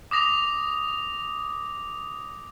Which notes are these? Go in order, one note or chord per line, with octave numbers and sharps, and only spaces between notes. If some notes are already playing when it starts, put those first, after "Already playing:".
D6 D#6 A#6 F7